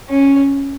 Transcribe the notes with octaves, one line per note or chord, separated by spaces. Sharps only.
C#4